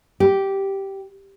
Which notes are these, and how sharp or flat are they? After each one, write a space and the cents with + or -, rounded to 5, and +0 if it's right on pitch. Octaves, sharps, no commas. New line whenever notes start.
G4 -10